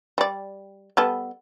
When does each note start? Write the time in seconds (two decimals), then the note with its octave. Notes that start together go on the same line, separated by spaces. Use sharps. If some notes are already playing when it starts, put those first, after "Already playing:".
0.18 G3 D5
0.97 G3 B3 A4